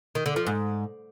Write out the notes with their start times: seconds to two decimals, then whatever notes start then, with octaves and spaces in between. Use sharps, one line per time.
0.15 D#3
0.26 D3
0.36 F3
0.47 G#2